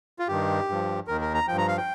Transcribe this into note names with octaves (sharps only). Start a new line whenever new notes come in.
F4
G2 D#3 G4
G2 F3
D#2 D#3 A#4
A#4
A#5
G2 F3 G5
A#5
F5
G5